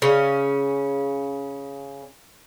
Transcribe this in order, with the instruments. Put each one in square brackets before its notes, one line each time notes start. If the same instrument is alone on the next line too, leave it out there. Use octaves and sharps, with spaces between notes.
[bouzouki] C#3 C#4